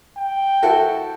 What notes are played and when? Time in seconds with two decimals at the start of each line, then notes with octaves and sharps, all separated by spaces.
0.18 G5
0.63 E4 F#4 A4